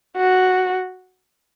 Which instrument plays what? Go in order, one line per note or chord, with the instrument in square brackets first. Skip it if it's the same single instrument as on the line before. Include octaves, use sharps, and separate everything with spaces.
[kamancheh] F#4